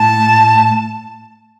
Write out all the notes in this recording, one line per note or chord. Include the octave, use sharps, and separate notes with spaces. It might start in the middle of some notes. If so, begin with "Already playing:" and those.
Already playing: A2 A5